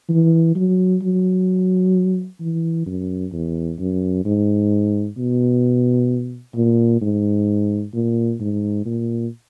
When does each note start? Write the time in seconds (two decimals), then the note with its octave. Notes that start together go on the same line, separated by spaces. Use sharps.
0.09 E3
0.55 F#3
1.02 F#3
2.40 E3
2.86 F#2
3.32 E2
3.79 F#2
4.25 G#2
5.17 B2
6.55 A#2
7.01 G#2
7.93 A#2
8.40 G#2
8.86 A#2